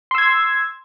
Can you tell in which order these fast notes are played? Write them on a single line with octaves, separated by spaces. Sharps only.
C6 E6 G#6